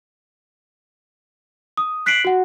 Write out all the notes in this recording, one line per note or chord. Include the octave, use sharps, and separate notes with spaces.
D#6
F#6 B6 C7 D7 F#7
F#4 F#5